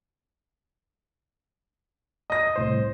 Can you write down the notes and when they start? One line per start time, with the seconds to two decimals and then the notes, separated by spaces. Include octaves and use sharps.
2.30 D#5 D#6 A#6
2.56 C2 A2 C5